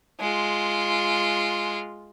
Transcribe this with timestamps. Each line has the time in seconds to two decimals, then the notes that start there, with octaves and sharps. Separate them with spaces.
0.20 G#3 F4